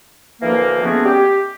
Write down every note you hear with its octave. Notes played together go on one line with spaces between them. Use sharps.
D2 E3 F3 A#3
G#3 A3 B3 C#4 F#4 G#4
G4